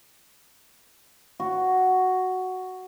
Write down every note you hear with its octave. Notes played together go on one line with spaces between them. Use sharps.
F#4